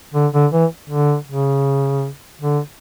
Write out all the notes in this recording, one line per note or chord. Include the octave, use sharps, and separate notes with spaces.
D3
D3
E3
D3
C#3
D3